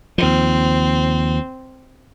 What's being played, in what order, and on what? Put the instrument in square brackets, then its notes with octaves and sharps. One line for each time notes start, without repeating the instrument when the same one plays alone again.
[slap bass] D#2 F3 [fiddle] C4